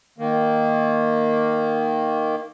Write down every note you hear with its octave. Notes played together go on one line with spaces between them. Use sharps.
D#3 A#3